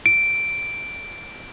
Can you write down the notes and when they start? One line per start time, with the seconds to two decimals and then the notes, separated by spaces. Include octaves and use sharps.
0.06 D7